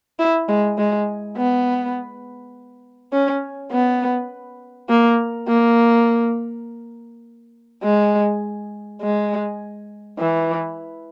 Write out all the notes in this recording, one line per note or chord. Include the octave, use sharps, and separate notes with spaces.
E4
G#3
G#3
B3
C#4
B3
A#3
A#3
G#3
G#3
E3